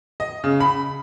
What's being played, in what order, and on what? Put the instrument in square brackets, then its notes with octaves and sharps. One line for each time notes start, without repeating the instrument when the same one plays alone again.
[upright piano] D#5
C#3
B5